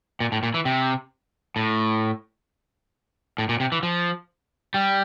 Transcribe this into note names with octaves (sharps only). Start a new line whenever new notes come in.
A#2
A2
A#2
E3
C3
A2
A2
A#2
C3
E3
F3
G3